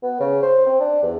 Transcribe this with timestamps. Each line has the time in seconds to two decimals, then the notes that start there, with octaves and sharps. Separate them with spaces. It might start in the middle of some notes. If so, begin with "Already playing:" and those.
0.03 B3
0.20 C#3
0.42 C5
0.66 C4
0.80 D4
1.03 E2